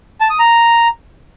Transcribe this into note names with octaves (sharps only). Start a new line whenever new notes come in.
A5
D#6
A#5